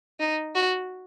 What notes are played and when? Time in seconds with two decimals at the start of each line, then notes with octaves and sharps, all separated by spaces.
0.20 D#4
0.55 F#4